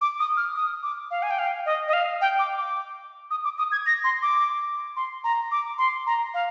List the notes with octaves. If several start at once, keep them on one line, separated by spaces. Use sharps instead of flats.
D6
D#6
F6
D#6
D6
F5
G#5
G5
F5
D#5
D#5
F5
G5
D6
D6
D#6
D6
D#6
G#6
A#6
C6
D6
C6
A#5
D6
C6
A#5
F5